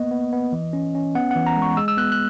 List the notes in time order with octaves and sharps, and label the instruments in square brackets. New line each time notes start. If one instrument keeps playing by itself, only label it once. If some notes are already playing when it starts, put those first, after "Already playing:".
Already playing: [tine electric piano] A#3 B3 D#5
B3
B3
E3
C#4
C#4
B3 F#5
E3 F#5
A#5
G#3
C#6
G#3 E6
E6
B3 F#6
F#6